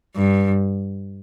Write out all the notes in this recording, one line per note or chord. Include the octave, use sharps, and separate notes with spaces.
G2